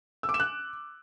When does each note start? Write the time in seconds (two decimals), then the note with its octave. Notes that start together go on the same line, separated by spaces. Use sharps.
0.23 E6
0.29 D6
0.34 E7
0.40 F#6